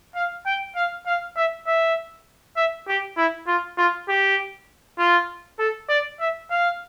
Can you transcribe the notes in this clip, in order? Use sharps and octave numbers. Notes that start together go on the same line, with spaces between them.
F5
G5
F5
F5
E5
E5
E5
G4
E4
F4
F4
G4
F4
A4
D5
E5
F5